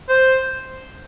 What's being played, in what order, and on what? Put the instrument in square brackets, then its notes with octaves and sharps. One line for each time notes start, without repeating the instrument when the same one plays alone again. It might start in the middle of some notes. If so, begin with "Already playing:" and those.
[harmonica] C5